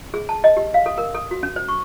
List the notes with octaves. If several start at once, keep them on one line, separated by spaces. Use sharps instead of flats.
G#4
A5
D#5
G4
F5
A4
A#4
A4
F#4
C#4
C5
C#6